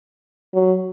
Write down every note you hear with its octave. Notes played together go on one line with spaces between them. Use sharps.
F#3